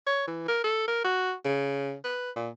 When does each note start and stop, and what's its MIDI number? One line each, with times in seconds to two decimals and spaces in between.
0.07 0.27 73
0.27 0.46 52
0.48 0.60 70
0.64 0.87 69
0.88 1.03 70
1.05 1.33 66
1.45 1.95 49
2.04 2.31 71
2.36 2.49 46